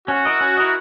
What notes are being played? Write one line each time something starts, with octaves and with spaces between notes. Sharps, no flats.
C#4 F#4
E4 A#4 D#5
C#4
E4 A#4 D#5